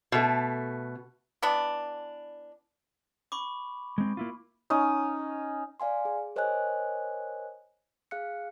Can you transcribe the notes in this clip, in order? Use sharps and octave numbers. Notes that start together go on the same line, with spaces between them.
B2 A3
E3 B3 D4
B5 C#6 D6
G#3 C4
A#3 E4 F4
C#4 D#4 D#6
D5 F5 G#5 C6
G#4
A#4 C5 C#5 D#5 G#5 F#6
G#4 F5 F#6 C#7